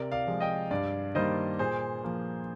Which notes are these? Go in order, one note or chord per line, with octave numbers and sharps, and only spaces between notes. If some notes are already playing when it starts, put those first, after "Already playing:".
Already playing: C3 A#4 D5
D5 F5
F3 G#3
D#5 G5
G2 D5 F5
D#3 G3 A#3 C5 D#5
A#2 G#4 C5
F3 A#3